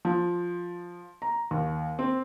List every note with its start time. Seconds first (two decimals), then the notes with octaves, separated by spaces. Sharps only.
0.05 F3
1.22 A#5
1.51 D#2
1.99 C4